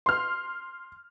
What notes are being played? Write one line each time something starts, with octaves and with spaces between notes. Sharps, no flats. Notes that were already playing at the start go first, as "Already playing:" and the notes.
C6 F6